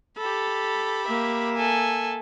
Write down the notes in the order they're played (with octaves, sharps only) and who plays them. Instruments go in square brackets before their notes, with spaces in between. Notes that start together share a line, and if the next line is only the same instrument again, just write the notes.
[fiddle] G4 B5 [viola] A4
[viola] A#3 E5
[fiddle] A4 G#5